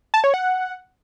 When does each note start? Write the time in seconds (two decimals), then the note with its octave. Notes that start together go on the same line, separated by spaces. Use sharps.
0.14 A5
0.24 C#5
0.34 F#5